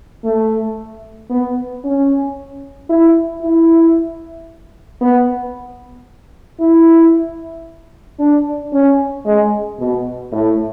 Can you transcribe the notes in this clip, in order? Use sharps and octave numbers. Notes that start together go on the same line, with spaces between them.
A3
B3
C#4
E4
E4
B3
E4
D4
C#4
G#3
B2
A2